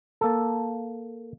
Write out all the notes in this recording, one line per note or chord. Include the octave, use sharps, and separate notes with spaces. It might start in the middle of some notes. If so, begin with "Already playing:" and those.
A#3 A4